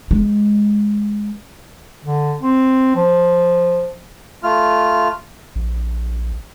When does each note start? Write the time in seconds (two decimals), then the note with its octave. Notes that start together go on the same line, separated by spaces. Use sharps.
0.11 G#3
2.05 D3
2.41 C4
2.95 F3
4.43 A3 F4 F6
5.56 A#1